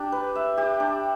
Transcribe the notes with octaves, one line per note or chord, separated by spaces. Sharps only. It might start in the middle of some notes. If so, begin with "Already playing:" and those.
Already playing: D4 G4
B4
E5
G4
D4